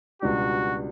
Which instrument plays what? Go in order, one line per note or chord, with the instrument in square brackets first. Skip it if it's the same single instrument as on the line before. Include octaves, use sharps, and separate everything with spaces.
[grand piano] C#2 B2 G3 D4 [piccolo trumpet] F#4